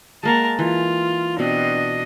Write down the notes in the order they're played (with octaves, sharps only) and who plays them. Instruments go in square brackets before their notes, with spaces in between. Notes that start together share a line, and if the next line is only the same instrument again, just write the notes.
[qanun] G#3 A#3 F#5 [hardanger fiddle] A#4 A5
[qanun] E3 [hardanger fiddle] F4
[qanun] B2 C4 [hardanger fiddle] D4 D#5